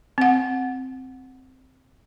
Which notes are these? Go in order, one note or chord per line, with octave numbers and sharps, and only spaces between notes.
C4 F#5